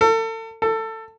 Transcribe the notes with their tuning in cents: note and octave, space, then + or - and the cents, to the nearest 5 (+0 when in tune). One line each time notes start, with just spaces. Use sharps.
A4 +35
A4 +20